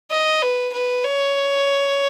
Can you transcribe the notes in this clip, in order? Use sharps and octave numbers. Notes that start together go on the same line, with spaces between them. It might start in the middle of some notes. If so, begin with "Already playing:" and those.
D#5
B4
B4
C#5